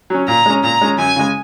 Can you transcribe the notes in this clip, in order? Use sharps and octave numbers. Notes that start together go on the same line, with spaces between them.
F#3 C#4
A#2 A#5
G#3 C#4
A#2 A#5
G#3 C#4
F#2 G#5
C#3 G#3